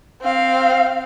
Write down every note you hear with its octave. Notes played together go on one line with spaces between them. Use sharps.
C4 F5